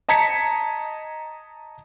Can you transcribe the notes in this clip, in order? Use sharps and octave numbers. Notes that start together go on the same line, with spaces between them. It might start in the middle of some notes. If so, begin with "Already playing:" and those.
D#5 A5 A#5 G#6 B6 C#7